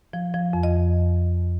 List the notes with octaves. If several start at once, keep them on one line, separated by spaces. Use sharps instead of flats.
F3
F3
F2
D#5